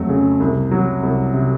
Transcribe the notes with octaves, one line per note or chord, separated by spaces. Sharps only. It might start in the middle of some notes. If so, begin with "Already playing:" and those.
Already playing: F2 F#3 A3
C#3
C2
F#3
C2
C3